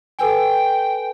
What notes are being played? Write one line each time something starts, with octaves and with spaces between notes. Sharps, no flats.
A4 B4 G5 G#5